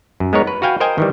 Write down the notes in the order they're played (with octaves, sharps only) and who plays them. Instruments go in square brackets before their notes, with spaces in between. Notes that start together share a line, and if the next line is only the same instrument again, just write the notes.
[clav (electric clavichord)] F#2
G#3 B3 D#4 A#4 C#5
B4
F#4 B4 F5 G5 G#5
A#4 C5 D#5 G5 G#5 A#5
D#3 E3 G3